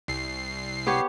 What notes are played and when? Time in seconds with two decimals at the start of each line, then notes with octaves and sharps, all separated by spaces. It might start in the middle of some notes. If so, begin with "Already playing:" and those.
0.08 C2 C7
0.87 B3 G4 C#5